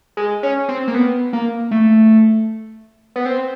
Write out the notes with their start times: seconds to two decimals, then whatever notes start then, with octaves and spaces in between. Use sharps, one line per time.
0.17 G#3
0.43 C#4
0.69 C4
0.88 A#3
0.95 B3
1.33 A#3
1.71 A3
3.16 B3
3.26 C4